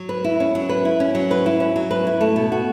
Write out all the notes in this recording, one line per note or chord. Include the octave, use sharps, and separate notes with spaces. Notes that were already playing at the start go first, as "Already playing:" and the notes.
Already playing: F#3
B4
E4
C#4
F#3
B4
E4
C#4
F#3
B4
E4
C#4
F#3
B4
E4
A3
B2
F#4